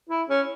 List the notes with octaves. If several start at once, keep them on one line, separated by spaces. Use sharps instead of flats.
E4
C#4